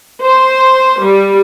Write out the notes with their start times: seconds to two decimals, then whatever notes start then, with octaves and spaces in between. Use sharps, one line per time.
0.21 C5
1.03 G3